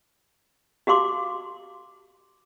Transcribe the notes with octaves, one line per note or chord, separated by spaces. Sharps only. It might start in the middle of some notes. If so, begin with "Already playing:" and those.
F#4 G4 F5 C6 D6